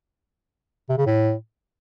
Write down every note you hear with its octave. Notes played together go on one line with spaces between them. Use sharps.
C3
C#3
A2